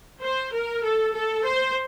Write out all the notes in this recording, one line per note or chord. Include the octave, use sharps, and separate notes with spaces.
C5
A#4
A4
A4
C5